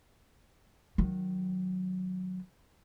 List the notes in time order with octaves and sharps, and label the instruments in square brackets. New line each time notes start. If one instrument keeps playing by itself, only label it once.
[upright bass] D#3 F#3